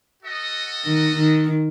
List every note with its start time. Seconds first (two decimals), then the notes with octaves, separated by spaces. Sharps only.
0.22 F#4 A4 D#5 F#5
0.85 D#3
1.16 D#3